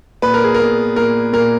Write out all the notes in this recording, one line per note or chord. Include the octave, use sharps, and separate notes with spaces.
A#2 B4
A#4
G#4
B3 A#4
A#2 A#4
A#2 A#4